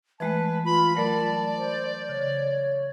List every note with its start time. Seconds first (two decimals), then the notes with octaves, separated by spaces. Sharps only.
0.20 E3 G#3 A3 B4 A5
0.65 F4 B5
0.97 F#3 A3 A#4 D5 A5
1.57 C5
2.09 C#3 C#5